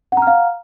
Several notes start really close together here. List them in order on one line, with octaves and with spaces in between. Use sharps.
F#5 A#5 F6 F5